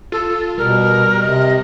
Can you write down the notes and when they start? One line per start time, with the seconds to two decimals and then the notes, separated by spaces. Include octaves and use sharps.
0.12 F4 A4
0.58 B2 G3 A#4
1.21 C3 D#5